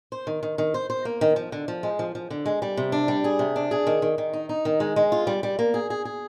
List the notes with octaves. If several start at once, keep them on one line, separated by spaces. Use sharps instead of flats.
C5
D#3
D#3
D#3
C5
C5
A#3
D#3
F3
D3
F3
G#3
F3
F3
D3
G#3
G3
C3
D4
G3
G#4
C3
D4
G#4
D#3
D#3
D#3
D#4
D#4
D#3
G#3
G#3
F4
G3
G3
A#3
G#4
G#4
G#4